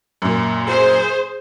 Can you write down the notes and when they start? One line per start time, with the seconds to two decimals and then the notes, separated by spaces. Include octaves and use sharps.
0.22 F#2 A#2
0.69 G#4 C5